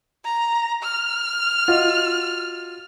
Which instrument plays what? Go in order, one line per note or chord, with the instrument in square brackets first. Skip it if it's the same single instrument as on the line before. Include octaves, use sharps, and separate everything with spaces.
[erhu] A#5
F6
[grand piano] F4 F#4 D#5